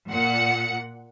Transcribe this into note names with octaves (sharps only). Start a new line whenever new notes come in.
A#2 F#5 C#7